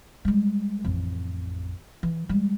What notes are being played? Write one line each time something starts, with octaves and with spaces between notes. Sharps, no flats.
G3 G#3
A1 F2
E3
G3 G#3